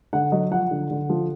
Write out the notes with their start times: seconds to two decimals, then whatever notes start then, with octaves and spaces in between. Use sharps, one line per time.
0.13 D3 F#5
0.32 F#3 D#5
0.51 F3 F#5
0.71 D3
0.91 D3
1.10 F3